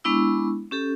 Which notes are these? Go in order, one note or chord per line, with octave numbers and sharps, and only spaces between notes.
G#3 B3 D4 E4 C#6 E6
C#4 G4 A4